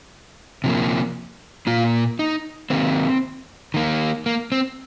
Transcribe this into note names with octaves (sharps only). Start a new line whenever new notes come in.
C3 F3 A#3
A#2 A#3 F4
D#4
D#3 A#3 C4
D#3 A#3
A#3
C4